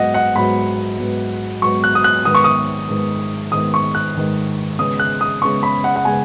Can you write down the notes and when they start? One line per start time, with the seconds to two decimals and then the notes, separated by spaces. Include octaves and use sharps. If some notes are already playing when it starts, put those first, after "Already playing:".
Already playing: G#2 F#3 B3 D#5 F#5
0.14 F#5
0.35 G#2 F#3 B3 B5
0.99 G#2 F#3 B3
1.62 G#2 F#3 B3 C#6
1.84 F#6
1.95 D#6
2.04 F#6
2.25 G#2 D#3 B3 D#6
2.35 C#6
2.44 D#6
2.89 G#2 D#3 B3
3.52 G#2 D#3 B3 D#6
3.74 C#6
3.95 F#6
4.15 G#2 D#3 B3
4.79 C#3 G#3 B3 D#6
5.00 F#6
5.21 D#6
5.42 C#3 G#3 B3 C#6
5.63 B5
5.84 F#5
5.96 F#5
6.05 C#3 G#3 B3 G#5